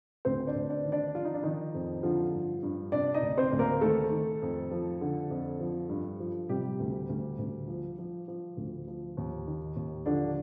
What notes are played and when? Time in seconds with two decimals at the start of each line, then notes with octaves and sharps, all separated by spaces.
0.25 D2 C4 C5
0.47 D4 D5
0.55 D2
0.69 D4 D5
0.85 D#3
0.92 D4 D5
1.14 F3 F4
1.25 D#4
1.34 D4
1.43 D#3 F3 D#4
1.74 F2
2.03 D3 F3 F4
2.33 G2
2.63 G2
2.92 C3 D4 D5
3.14 D#4 D#5
3.22 D2
3.37 C4 C5
3.52 D2
3.59 A#3 A#4
3.81 D#3 A3 A4
4.11 D#3
4.42 F2
4.71 F3
5.01 D3
5.30 F2
5.60 F3
5.89 G2
6.20 F3
6.49 C3 G3 G4
6.80 D2
7.09 D2
7.39 D2
7.68 F3
7.98 F3
8.28 F3
8.57 D2
8.87 F3
9.17 D#2
9.47 D#3
9.76 D#2
10.06 D3 F3 D4